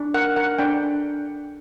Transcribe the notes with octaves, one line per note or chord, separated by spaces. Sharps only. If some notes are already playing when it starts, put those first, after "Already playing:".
Already playing: D4
A#4 F#5
A#4 F#5
D4 G5